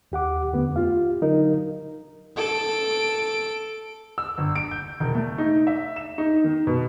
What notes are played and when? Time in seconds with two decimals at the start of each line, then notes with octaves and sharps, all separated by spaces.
0.12 D#2 G4 F#5 D6
0.53 F2 D3 A3 B3
0.76 F4 G4 F5
1.21 D3 F#3 D#4 A#4
2.37 A4 D7
4.18 E6
4.38 G1
4.56 D7
4.71 G6
5.00 E1
5.15 A3
5.38 D#4
5.67 E5
5.96 E7
6.18 D#4
6.44 D#3
6.67 B2